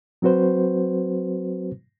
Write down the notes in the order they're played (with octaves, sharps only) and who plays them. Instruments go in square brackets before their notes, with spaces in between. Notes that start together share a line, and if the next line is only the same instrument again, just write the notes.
[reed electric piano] F#3 C4 F#4 B4 C5